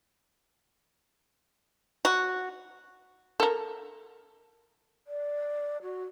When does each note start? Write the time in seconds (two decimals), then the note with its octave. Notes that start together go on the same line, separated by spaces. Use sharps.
2.05 F#4
3.40 A4 A#4
5.07 D5
5.82 F#4